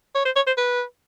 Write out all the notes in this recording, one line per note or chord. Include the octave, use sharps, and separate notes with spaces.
C#5
C5
C#5
C5
B4